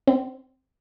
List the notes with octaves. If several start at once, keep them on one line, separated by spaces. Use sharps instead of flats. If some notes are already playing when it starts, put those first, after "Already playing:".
C4